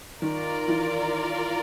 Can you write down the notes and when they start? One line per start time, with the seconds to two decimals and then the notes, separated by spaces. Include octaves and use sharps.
0.22 D#3 F4 A#4 D5
0.68 E3